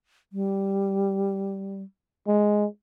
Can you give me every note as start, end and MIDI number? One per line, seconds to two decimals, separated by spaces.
0.33 1.82 55
2.27 2.65 56